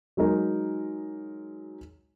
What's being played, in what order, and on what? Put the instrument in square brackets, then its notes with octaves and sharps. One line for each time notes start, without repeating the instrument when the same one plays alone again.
[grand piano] F#3 G#3 D#4 A#4